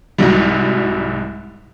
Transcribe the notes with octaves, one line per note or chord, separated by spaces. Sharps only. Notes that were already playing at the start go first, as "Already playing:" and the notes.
C2 G#2 F#3 G3